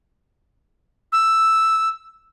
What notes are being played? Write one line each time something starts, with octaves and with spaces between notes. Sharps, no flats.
E6